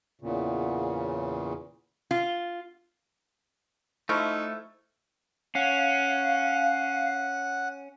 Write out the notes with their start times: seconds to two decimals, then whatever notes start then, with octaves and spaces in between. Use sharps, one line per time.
0.21 E2 A#2 C#3
2.11 F4
4.09 F3 A3 D#4 E4 C#6 F6 D7
5.55 C#4 F5 F#5